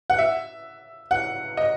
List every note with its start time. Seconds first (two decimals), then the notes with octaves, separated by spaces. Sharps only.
0.10 F#5
0.19 E5
1.11 F#5
1.57 D#5